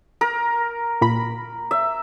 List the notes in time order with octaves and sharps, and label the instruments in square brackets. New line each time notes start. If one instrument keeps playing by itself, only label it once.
[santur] A#4
[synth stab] A#2 B5
[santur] E5